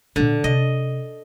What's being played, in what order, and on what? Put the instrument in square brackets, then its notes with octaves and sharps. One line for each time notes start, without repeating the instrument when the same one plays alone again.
[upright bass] A#2 B3 [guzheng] D3
[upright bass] C3 [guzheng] D#5